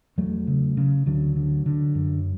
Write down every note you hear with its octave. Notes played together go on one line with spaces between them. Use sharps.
E2 F#3 A3
C#3
C#3
D2 D3 F#3
D3
D3
F#2